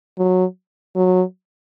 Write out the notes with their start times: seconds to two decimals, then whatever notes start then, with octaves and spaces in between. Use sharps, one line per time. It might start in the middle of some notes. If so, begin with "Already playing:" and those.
0.18 F#3
0.95 F#3